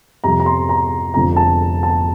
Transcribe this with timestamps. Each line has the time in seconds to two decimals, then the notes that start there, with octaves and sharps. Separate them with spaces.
0.24 F2 C3 G3 A#5
0.40 A#5
0.46 C6
0.69 A#5
1.14 F1 F2 D3 F3 A#5
1.36 A5
1.83 A5